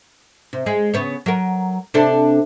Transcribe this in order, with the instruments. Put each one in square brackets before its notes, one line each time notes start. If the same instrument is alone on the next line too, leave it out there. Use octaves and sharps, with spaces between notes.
[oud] C3
G#3 G#4 D#5
C#3 B3 C#5
F#3 A#4
C3 D4 A4